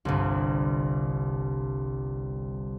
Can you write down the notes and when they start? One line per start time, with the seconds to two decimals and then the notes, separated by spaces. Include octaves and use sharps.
0.05 G1 C2